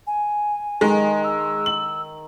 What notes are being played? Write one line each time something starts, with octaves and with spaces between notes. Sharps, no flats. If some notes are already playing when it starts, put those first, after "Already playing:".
G#5
D#3 G#3
E6
F#7